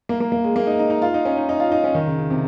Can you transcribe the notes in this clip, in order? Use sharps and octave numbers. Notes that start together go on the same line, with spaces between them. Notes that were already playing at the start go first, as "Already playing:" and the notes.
A#3
A#3
A#3
G#3
A#3
D#4
D#4
D#4
F4
D#4
C#4
D#4
D#4
F4
D#4
C#4
D#3
C#3
C#3
C3